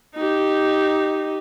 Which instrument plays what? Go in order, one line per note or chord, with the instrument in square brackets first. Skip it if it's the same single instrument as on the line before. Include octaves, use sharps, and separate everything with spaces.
[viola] D#4 G4